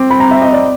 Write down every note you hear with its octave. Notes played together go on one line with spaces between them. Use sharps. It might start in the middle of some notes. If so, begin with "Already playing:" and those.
Already playing: C4 D6
B5
A#5
E5
D#5
D5